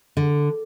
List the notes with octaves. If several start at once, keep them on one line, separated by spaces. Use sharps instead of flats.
D3